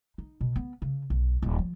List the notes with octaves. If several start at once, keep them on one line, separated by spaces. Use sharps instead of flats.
D#4
B2
B3
C#3
B1
D#1
F3